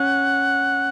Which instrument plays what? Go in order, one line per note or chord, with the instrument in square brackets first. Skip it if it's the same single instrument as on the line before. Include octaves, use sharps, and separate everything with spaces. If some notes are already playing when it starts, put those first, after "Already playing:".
Already playing: [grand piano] C#4 [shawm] F#5